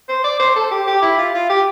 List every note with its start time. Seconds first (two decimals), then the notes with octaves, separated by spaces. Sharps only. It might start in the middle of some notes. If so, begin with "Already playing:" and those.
0.09 C5
0.24 D5
0.40 C5
0.56 A4
0.71 G4
0.87 G4
1.02 E4
1.18 F4
1.34 F4
1.50 G4